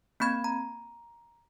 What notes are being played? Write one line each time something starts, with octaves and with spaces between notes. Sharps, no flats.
A#3 C4 B5 G#6
A#5